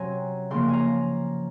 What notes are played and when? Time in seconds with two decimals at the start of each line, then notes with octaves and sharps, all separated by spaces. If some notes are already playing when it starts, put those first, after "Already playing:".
Already playing: C3 F#3 C#4 G#5 A#5 C6
0.51 C#3 F3 A#3 C6
0.68 G#5 A#5